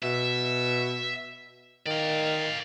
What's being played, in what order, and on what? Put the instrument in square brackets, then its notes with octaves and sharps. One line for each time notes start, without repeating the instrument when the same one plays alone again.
[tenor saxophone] B2 [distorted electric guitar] E5
[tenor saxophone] D#3 [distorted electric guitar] D5 F5